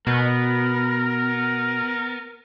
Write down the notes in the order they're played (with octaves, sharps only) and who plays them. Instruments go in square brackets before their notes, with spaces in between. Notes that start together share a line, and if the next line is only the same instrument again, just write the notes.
[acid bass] B2 [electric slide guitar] B3 [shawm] A#4